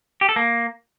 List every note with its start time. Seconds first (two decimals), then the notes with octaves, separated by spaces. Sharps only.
0.21 G4
0.29 A4
0.36 A#3